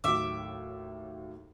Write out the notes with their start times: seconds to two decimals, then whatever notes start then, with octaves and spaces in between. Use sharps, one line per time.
0.04 D#2 A2 F#3 E5 D6